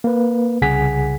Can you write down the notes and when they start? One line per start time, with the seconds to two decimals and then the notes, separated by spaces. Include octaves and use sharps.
0.04 A#3 B4
0.62 C2 C#3 G#4 F#5 G#5 B6